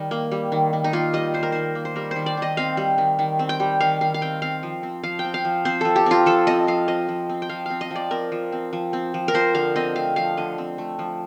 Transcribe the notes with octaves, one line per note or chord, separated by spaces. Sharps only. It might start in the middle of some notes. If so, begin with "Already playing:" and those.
Already playing: D#3 G3
A#3
G3
D#3
D#3
D#4
A#3 F4
G3 D#5
D#3 C5
A#4
D#3 C5
A#3
C5
G3 A#4
D#3 C5
D5
D#3 D#5
C4 F5
G3
D#3
D#3
C4
G5
G3
D#3 F5
D#3 F5
F5
C4 G5
C4 F5
F3
C4
F3 F5
G5
C4
F5
F3
C4 C5
F3 A4
G4
C4 F4
F3 A4
C4 D#5
F3 F5
C4 D#5
F3
C4
G5
F3 F5
C4 F5
D#5
F3 D5
C4 A#4
F3
C4
F3
C4
F3
A#4
F3 C5
D3 F5
C4 D#5
A3 F5
F3 F5
D3 D#5
C4
A3
F3